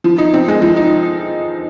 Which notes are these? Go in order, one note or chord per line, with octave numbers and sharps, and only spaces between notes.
F3
D#4
C4
G#3
F3
D#4